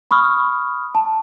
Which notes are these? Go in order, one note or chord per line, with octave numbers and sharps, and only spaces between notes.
B5 C#6 D#6 F6
A5